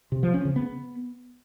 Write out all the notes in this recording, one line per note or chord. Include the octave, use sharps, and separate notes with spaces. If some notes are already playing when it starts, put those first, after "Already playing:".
C3
F3
C#4
C#3
B3